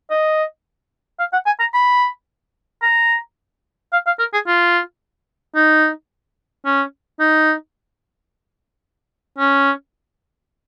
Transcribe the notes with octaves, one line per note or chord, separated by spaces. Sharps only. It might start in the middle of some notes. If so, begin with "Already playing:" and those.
D#5
F5
F#5
G#5
A#5
B5
A#5
F5
F5
A#4
G#4
F4
D#4
C#4
D#4
C#4